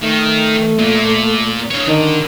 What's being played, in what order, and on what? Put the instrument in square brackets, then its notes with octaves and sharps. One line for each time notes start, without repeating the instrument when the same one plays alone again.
[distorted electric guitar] D#3 [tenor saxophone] A3
[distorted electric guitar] A#2
D3 C#5
[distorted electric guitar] D3 [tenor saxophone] D#3